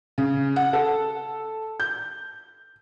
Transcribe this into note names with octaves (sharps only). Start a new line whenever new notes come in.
C#3
F#5
A4
G6